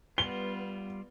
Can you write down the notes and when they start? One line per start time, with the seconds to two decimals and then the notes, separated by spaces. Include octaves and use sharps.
0.18 G3 B3 F4 G7